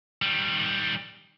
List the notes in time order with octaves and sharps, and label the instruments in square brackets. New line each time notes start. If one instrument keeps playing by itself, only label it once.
[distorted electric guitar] D#3 G3